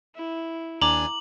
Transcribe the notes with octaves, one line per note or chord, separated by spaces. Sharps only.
E4
D#2 D4 G#5 A#5 D6 F#7